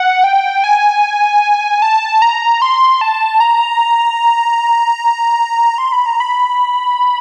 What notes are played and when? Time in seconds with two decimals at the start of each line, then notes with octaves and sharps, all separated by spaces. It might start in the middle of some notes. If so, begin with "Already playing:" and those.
Already playing: F#5
0.24 G5
0.64 G#5
1.82 A5
2.22 A#5
2.62 C6
3.01 A5
3.40 A#5
5.78 C6
5.92 B5
6.06 A#5
6.20 B5